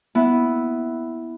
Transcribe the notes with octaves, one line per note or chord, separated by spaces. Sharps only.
B3 E4